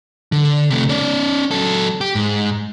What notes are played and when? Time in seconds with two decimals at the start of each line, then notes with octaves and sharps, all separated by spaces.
0.32 D3
0.70 C3 A3
0.90 C#4 D5
1.51 F#3 A4
2.01 G4
2.15 G#2